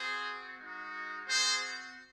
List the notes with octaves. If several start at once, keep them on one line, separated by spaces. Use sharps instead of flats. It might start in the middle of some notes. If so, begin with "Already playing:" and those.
Already playing: C4 F#4 G#4 C5
G#3 D#4 F#4
C4 F#4 G#4 C5